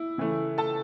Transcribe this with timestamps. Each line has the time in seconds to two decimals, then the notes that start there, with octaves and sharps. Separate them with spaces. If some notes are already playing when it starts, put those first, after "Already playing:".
Already playing: E4
0.18 C#3 E3 A3
0.58 A4 A5